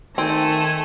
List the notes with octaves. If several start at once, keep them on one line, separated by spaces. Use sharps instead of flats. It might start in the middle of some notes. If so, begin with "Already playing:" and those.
D#3 A3 C4 G#5